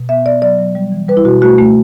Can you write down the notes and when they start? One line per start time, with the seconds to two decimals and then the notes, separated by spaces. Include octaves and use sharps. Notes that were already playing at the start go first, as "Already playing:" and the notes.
Already playing: B2
0.09 B3 E5
0.26 B3 D5
0.42 F#3 D5
0.59 F#3
0.75 G3
0.92 E3
1.08 G3 B4
1.17 E4
1.25 B2 F#4
1.42 A3 F#4
1.58 A3